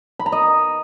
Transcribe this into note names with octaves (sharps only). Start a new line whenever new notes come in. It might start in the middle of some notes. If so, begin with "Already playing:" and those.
B5
A#5
D#5